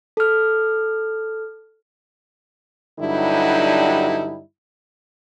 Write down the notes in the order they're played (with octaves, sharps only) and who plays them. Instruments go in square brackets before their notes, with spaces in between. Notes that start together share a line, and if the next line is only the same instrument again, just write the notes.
[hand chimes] A4 F6
[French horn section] G2 D3 F#3 G3 D#4 E4